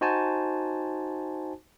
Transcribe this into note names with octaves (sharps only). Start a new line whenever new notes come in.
D#4 F#4 C5 G#5 A5